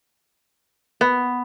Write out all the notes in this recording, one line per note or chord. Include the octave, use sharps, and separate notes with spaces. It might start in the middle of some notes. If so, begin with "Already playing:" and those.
B3